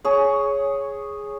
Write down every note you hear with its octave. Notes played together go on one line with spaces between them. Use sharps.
G#4 C#5